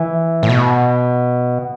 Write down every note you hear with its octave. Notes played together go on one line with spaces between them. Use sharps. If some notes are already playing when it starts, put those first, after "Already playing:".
Already playing: E3
A2
B2